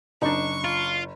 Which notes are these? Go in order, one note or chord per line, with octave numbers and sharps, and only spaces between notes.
F#1 D4 D#4 C#6
F4